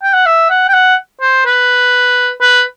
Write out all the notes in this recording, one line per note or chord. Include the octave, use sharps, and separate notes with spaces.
G5
F#5
E5
F#5
G5
F#5
C5
B4
B4